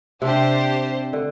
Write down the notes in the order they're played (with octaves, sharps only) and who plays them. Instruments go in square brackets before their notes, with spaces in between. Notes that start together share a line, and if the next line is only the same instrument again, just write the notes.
[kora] C3 [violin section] D4 G4 C5
[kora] D3